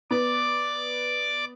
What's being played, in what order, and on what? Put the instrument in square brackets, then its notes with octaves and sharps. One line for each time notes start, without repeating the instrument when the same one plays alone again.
[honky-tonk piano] B3 [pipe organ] D5 D6